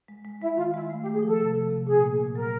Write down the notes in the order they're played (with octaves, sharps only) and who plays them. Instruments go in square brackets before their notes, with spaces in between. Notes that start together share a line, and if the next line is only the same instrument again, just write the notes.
[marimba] G#3
G#3
[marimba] G#3 [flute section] E4
[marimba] D#3 [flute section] F4
[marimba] G#3 [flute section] E4
[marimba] A3
[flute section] G4
[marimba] A3
[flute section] G#4
[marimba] F3 [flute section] A4
[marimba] C3
F3
C3
[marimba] A#2 [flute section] G#4
[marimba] A#3
A#2
[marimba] F#3 [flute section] A#4